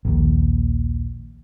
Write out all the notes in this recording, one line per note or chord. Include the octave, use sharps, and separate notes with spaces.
A#1 D#2